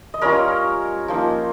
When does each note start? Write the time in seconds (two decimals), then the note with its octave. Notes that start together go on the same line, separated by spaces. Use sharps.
0.14 D#5
0.21 G3 C#4 F4 A#4 C#5
1.08 F3 A#3 D#4